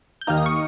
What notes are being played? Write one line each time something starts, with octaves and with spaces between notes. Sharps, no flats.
G6
D#2 D#3 A#3 D#4 F6
D#6
C#6